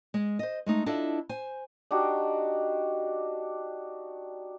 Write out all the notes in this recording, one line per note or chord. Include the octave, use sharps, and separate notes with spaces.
G#3
C5 D#5
G#3 A3 D#4
D4 E4 F4 A4 D#5 E5
C5 G#5
D4 D#4 F#4 G4